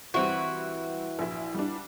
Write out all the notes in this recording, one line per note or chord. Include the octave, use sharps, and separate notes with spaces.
E3 G3 C4 E4 F#4
A#1 E4
G3 D4